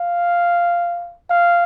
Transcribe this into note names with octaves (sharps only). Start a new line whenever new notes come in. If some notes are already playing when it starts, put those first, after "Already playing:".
Already playing: F5
F5